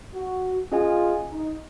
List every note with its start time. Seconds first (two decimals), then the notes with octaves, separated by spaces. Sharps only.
0.14 F#4
0.72 C#4 F4 G#4 D#5 G#5
1.31 D#4